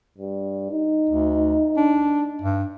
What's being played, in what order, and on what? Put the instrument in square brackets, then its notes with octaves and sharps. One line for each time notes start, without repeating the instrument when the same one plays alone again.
[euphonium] G2
D#4
[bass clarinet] D2
D4
G2